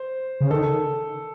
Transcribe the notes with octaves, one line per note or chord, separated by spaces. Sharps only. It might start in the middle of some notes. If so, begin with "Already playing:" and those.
Already playing: C5
C#3
D#3 A4